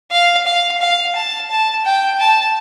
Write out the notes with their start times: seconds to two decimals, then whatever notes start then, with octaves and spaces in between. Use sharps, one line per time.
0.12 F5
0.46 F5
0.81 F5
1.16 A5
1.50 A5
1.85 G5
2.20 A5